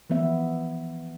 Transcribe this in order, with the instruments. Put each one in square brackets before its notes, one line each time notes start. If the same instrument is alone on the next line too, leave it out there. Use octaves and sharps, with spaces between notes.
[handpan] E3 F3 B3 E5